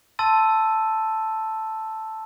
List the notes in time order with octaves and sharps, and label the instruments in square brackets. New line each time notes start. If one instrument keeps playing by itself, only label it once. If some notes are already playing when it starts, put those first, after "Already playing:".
[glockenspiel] A5 C6 E6 A6 D#7